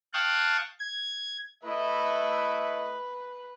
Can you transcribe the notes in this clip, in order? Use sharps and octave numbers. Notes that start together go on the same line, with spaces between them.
F5 G5 A5 C#6 D#6 F#6
G#6
A3 E4 B4 D#5